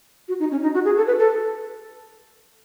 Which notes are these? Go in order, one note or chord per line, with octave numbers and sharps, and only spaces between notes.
F#4
D#4
C#4
D#4
F#4
G#4
A4
B4
A4